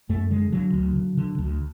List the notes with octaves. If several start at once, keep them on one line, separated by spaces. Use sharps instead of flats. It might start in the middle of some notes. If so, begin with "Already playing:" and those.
F#2 A3
D3 G#3
D3 F#3
D2
D3
D3
D2